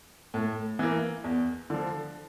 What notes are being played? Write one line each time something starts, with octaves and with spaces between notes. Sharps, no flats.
A2
E3 A#3
E2
D3 F3